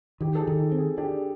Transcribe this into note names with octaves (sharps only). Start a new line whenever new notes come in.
D#3 G4
A4
G#4
D#3
G4
C4
G#4
D4 G4